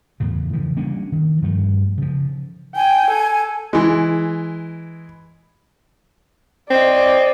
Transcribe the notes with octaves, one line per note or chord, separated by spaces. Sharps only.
E2 A2 C#3
C#3 E3 F3
G3 A#3 C#4 D4
D#3
G2 F3 G3 A3
C#3 F3
G5 G#5
A4
E3 G#3
C4 D5 D#5